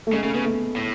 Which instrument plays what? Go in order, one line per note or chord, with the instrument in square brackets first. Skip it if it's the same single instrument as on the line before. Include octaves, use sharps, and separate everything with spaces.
[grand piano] A3
[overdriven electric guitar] C#3 [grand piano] G#3
[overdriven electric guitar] C#3 [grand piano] A3
[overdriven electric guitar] C#3 [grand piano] B3
[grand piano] A3
[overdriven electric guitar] A2